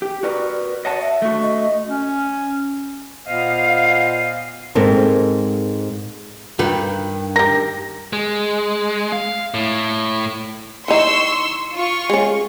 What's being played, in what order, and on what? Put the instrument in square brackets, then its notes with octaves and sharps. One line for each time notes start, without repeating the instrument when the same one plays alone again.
[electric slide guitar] G4
[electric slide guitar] F#4 A#4 B4 [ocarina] D5
[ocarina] C#5 [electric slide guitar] D#5 F#5 A5
[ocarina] E5
[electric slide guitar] A3 F#4
[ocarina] D#5
[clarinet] C#4
[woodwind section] A#2 B3 C5 D#5 F5
[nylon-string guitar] G#2 C4 D#4 A4 A#4
[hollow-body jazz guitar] G2 D#3 B4
[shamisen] G4 A#4 [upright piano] A#6
[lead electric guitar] G#3
F5
A2
[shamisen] E3 D#4 [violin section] C6 C#6 E6
[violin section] F4 C#6
[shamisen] G#3 C#4